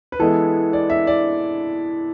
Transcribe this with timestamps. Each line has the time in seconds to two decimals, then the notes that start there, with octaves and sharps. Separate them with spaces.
0.12 B4
0.20 E3 G#3 B3 E4 A4
0.73 D5
0.90 E5
1.07 D5